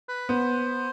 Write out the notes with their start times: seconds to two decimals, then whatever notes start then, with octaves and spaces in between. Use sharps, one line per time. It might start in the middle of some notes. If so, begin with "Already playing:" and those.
0.09 B4
0.29 B3 C5